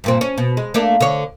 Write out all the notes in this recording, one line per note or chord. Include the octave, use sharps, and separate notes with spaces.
G2 A#2 C4
C#4
B2
G#3
A3 A#3 D4
D3 C#5